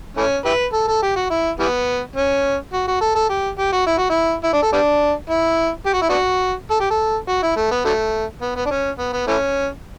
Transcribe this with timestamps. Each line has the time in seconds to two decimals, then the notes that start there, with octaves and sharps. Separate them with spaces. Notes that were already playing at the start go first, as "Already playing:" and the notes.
0.17 E3 A3 C#4
0.45 E4 G4 B4
0.73 A4
0.88 A4
1.03 G4
1.16 F#4
1.30 E4
1.59 E3 G3 B3
2.16 C#4
2.73 F#4
2.88 F#4
3.01 A4
3.15 A4
3.29 G4
3.58 G4
3.72 F#4
3.87 E4
3.98 F#4
4.10 E4
4.44 E4
4.53 D4
4.62 A4
4.72 G3 B3 D4
5.29 E4
5.86 G4
5.94 F#4
6.02 E4
6.09 B3 D4 F#4
6.71 A4
6.80 G4
6.90 A4
7.28 F#4
7.43 E4
7.56 A3
7.71 B3
7.85 D3 F#3 A3
8.42 B3
8.56 B3
8.65 D4
8.71 C#4
8.99 B3
9.13 B3
9.27 E3 A3 C#4